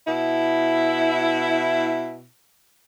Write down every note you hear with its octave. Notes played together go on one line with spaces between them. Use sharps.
B2 E4